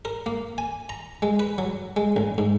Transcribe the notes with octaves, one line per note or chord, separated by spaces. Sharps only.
A#4
A#3
G#5
A#5
G#3
B4
F#3
G#3
A1
G#2